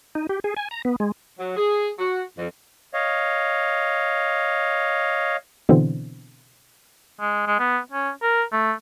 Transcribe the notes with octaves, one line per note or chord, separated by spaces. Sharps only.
D#4
G4
G#4
G#5
A#5
B3
G#3
F#3
G#4
F#4
F2
C#5 D#5 F5
B2 D3 E3 C4
G#3
G#3
B3
C#4
A#4
A3